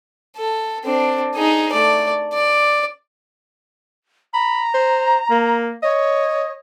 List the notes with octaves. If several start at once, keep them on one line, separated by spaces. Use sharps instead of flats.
A4
C4 D4
D#4 G#4
A3 D5
D5
A#5 B5
C5
A#3
C#5 D#5